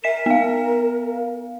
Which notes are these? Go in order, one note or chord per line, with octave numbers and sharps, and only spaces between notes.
A#4 E5 B6 E7
B3 F5